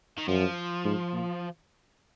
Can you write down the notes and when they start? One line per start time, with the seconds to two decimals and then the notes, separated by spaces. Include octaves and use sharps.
0.18 D#3
0.28 F#2 F3
0.85 G#2
1.13 A#2